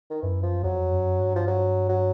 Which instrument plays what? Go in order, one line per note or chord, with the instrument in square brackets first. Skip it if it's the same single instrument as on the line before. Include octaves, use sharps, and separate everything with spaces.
[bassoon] D#3
[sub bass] F#2 [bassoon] E3
[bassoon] F3
[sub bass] F2 [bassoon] F#3
[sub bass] F#2
G2
[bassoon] F3
F#3
F#3